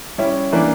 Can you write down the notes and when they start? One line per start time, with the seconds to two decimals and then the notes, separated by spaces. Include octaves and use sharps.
0.18 G3 C#4 E4
0.52 E3 A#3 D4